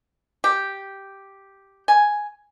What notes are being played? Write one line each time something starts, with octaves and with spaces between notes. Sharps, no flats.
G4
G#5